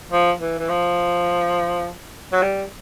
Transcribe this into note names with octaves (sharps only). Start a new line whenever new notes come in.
F3
E3
E3
F3
F#3
G3